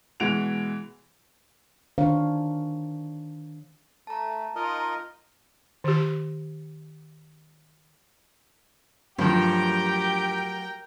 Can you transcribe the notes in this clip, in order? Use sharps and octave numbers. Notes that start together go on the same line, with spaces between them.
B2 E3 G#3 F#5 D7 F7
D#3 D4 C5 C#5 F5
A3 A5 A#5
D#4 F4 A#4 D#5
D#3 G4
G2 F3 F#3 A3 G4 A#4 G5